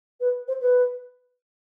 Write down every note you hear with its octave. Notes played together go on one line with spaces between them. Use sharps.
B4
C5
B4